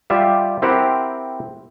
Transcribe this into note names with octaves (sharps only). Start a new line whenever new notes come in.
G3 F4 G4 E5
C4 E4 G4 A#4 C5 F#5